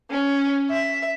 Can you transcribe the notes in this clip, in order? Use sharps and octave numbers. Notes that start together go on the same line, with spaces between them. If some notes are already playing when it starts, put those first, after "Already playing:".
C#4
E5